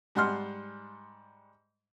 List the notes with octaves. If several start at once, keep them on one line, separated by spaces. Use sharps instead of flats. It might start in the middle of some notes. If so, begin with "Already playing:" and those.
G#2 G3 F#5 C6 F6